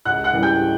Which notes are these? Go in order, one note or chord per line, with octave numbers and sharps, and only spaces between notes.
C#2 F#5 F#6
F#5 F#6
C#3 E3 G3
G5 G6